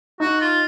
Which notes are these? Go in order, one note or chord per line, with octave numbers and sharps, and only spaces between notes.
D#4 F#4
F4